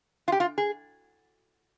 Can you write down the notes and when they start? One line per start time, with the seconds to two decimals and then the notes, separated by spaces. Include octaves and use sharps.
0.28 F4
0.32 G4
0.40 F4
0.58 G#4